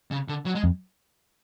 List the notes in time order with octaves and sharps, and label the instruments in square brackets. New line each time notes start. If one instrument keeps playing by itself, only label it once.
[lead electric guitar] C#3
D3
F#3
G#3
[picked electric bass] F2